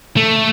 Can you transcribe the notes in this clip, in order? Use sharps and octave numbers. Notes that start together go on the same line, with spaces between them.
A3